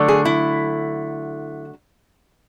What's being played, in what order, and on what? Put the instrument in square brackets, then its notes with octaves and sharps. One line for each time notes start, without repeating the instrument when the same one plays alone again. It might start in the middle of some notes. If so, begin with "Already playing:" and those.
Already playing: [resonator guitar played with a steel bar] D3 F#3 A3
G#4
E4